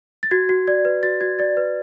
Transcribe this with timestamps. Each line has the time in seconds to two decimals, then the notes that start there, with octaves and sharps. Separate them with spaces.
0.23 A6
0.31 F#4 G#6
0.49 F#4
0.67 D5 G#6
0.85 B4
1.03 F#4 A6
1.21 F#4 G#6
1.39 D5 A6
1.57 B4